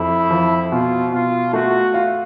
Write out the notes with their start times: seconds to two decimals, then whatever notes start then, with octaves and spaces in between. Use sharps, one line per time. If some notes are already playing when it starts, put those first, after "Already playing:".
Already playing: F2 E4
0.31 F3
0.72 B2 F4
1.13 B2 F4
1.53 A3 F#4
1.94 F4